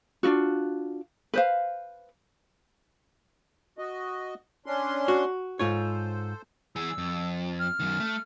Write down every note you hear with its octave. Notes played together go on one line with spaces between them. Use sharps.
D4 D#4 F4 F#4
B4 C5 F5
F#4 D#5
C#4 D4 C6
F#4
G#2 F4 A4 C5 C#5
E3 G#4 E6
F2
F6
F#2 D#3
A3